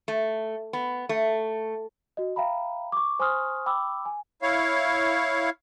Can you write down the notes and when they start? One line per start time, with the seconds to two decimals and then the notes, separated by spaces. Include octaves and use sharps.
0.08 A3
0.73 B3
1.09 A3
2.17 F#4 D#5
2.36 E5 F5 G5 A#5 B5
2.92 C#6 D6
3.19 C5 G#5 C6 C#6 D#6 F6
3.66 G5 B5 D6 E6
4.05 G#5
4.42 E4 C#5 F5